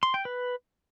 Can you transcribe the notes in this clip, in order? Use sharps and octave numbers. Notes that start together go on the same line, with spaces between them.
C6
G5
B4